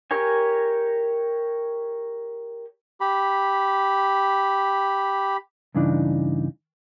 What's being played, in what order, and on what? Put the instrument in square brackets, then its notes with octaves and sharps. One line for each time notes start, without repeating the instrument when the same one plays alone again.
[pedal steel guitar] G4 A#4 C#5 G#5
[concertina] G4 B5
[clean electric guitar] G2 C#3 E3 D4 D#4